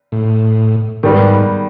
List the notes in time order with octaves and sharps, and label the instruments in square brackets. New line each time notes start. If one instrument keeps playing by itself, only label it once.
[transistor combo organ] A2
[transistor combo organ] G#2 [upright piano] D#3 G3 B3